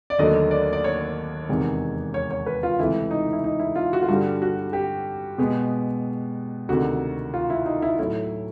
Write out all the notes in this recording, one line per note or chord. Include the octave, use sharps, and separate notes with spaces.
D5
D#2 D3 F#3 A3 D#5
D5
D5
C#5
E2 C3 D#3 G#3
C#5
C#5
B4
F4
C#2 C3 E3 A3 E4
D#4
E4
D#4
E4
F4
F#4
F4
G2 D3 G3 F#4
F#4
G4
B2 G#3 B3
D2 C3 D#3 F#4
F4
E4
D#4
E4
A2 F#3 A3 E4